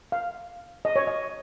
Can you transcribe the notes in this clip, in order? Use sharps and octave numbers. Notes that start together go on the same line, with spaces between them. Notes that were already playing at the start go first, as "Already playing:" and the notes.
F5
D#5
C#5
D#5